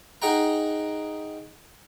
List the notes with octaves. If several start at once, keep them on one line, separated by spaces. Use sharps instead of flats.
D#4 G#4 D#5 F#5 G5 A#5